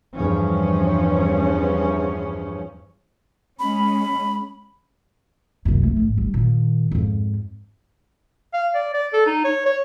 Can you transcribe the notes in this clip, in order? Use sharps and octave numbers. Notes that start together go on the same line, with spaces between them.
E2 G2 F3 C#4
G#3 C#4 B5
C2 F#2
A3 C4
A1 G#2
G2
A#2 D#3
F2 G#2
F5
D5
D5
A4
D#4
C#5
C#5